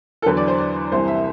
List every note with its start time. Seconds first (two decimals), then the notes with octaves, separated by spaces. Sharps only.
0.22 A4
0.26 E2 D3 F#3 B4
0.37 D5
0.48 C5
0.58 D5
0.92 C2 C3 E3 C5
1.08 E5